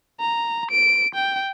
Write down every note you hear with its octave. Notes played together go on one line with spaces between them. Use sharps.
A#5
D7
G5